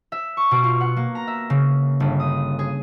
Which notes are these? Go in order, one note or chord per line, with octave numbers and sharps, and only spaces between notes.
E5
C#6
B2
F4
F#5
A#3
A#5
E5
C#3
G1
D#6
G#4